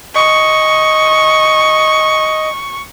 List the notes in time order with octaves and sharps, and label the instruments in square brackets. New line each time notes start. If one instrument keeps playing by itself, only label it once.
[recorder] D#5 [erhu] C#6